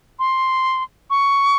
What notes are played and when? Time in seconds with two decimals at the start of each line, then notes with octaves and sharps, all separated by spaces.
0.19 C6
1.10 C#6